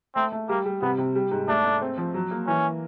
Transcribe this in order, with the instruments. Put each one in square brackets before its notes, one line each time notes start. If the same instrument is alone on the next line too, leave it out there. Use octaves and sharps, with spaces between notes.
[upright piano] A3 [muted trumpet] C4
[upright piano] A3
[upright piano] G3 [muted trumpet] A#3
[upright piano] G3
[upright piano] C3 [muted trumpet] B3
[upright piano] C3
G3
G#2
[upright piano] A3 [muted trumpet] D4
[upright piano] A3
C4
F3
F#3
A#3
[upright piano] E3 [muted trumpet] C#4